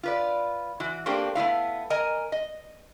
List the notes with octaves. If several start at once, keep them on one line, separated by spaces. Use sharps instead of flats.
F4 B4 D5
E3 F#4
A3 A#3 C4 D4 G4
A3 B3 E4 F5
A#4 D#5 G#5 A#5
D#5